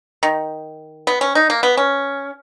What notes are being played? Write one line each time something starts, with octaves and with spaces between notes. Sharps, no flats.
D#3
B3
C#4
D#4
A#3
B3
C#4